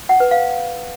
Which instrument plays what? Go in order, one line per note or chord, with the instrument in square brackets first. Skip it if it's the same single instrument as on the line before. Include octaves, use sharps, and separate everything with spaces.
[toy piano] F#5
B4
F5